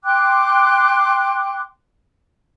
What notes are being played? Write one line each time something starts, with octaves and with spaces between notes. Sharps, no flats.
G5 C6 D6 F#6